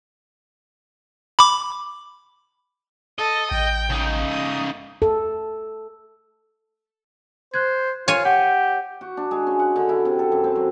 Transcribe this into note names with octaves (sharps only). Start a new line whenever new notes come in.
B5 D6
A4 D#5
A1 G5
C#3 D#4
D#6
A4
C5 F#6 G#6
F4 C#5 G#5
G4 F#5
F#4
D4
G#3
C#4
F#5
D3
E4
C3
A4
F#2
C4
F#3